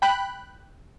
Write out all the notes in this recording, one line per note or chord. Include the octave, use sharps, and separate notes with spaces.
G5 B5 F#6